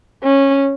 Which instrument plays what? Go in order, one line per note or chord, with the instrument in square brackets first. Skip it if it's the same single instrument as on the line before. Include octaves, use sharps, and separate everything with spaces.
[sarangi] C#4